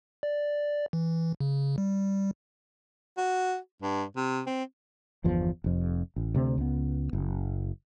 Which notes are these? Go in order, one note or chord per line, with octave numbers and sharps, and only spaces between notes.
D5
E3
C#3
G3
F#4
G2
C3
C4
G1 E2 F3
F1 F2
A1
D2 C3 C4
C#2 B3
F#1